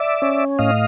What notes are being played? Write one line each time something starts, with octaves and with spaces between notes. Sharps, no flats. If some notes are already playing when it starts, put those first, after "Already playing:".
Already playing: D5 E5
C#4
A2 D#5 F5